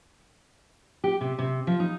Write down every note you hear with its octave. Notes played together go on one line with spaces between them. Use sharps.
G4
C3
C3
F3
D#4